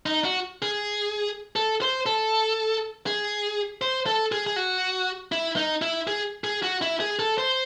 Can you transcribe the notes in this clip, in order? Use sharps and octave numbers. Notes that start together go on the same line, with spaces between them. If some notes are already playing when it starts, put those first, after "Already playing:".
D#4
F#4
G#4
A4
C5
A4
G#4
C5
A4
G#4
G#4
F#4
E4
D#4
E4
G#4
G#4
F#4
E4
G#4
A4
C5